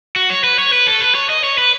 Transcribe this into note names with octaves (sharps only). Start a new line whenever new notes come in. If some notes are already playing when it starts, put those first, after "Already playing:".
F#4
C#5
B4
C#5
B4
A4
B4
C#5
D#5
C#5
B4